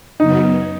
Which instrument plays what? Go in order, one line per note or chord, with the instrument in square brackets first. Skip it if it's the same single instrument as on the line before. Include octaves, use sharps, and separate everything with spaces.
[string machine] F#2 C#3 F#3 B3 [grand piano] D#4